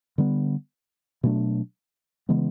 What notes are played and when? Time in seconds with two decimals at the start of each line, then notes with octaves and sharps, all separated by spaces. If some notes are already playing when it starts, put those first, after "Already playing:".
0.18 D3 G3 B3
1.23 B2 F#3 A3 D4
2.29 C#3 E3 G#3 B3